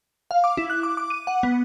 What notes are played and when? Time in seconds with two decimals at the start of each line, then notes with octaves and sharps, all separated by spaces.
0.31 F5
0.44 D6
0.57 E4
0.70 F#6
0.83 D6
0.97 D6
1.10 D#7
1.27 F#5
1.43 B3